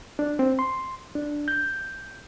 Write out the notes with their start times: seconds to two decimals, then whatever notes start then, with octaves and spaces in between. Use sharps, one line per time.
0.19 D4
0.39 C4
0.59 C6
1.15 D4
1.48 G6